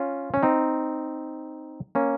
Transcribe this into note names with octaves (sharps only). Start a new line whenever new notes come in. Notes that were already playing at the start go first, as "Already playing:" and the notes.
Already playing: C#4 F4
C#4
C4 D#4
A#3 C#4